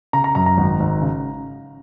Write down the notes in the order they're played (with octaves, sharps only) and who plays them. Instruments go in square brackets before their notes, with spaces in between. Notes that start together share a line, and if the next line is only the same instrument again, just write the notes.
[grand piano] C#3 A#5
A#5
F#2 A#5
A#5
G#1
G#1
C#3